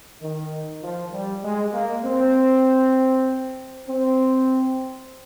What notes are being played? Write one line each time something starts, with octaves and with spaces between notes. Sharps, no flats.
D#3
F3
G3
G#3
A#3
C4
C4